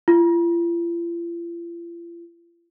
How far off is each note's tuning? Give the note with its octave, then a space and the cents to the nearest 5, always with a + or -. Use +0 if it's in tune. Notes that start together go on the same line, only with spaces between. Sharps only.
F4 -45